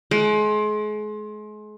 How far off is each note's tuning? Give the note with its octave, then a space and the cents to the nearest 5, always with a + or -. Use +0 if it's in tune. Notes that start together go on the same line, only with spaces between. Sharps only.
G#3 +35